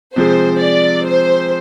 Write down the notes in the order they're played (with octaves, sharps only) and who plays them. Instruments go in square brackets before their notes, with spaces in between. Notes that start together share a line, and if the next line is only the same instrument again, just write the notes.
[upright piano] C3 F3 G#3 [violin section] C5
[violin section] D5
C5